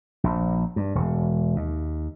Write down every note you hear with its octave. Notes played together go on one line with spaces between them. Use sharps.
A#1
G2
E1
D#2